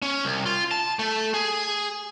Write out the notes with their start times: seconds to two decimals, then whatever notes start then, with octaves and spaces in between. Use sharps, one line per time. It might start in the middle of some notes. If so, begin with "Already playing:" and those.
0.02 C#4
0.25 C2
0.46 F4
0.71 A5
0.99 A3
1.34 G#4